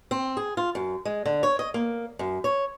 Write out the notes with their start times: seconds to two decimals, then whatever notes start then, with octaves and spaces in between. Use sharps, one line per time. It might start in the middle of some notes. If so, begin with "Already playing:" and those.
0.11 C4
0.37 G#4
0.57 F4
0.75 F#2
1.05 G#3
1.26 D3
1.43 C#5
1.59 D#5
1.74 A#3
2.19 F#2
2.44 C#5